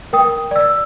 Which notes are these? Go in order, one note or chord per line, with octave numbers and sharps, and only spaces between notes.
A#4 G5 D#6
D5 E6